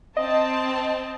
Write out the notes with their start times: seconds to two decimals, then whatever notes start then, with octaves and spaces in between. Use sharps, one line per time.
0.17 C4 D#5 A5